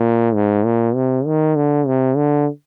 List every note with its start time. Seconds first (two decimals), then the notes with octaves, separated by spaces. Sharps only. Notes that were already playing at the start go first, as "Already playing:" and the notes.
Already playing: A#2
0.35 G#2
0.65 A#2
0.95 C3
1.26 D#3
1.56 D3
1.87 C3
2.16 D3